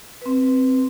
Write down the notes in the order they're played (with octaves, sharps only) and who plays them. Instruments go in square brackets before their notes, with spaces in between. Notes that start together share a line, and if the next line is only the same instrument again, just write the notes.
[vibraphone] C4 B4